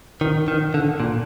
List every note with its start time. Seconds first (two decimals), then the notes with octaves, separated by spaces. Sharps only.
0.21 D#3
0.48 D#3
0.74 D3
1.00 A#2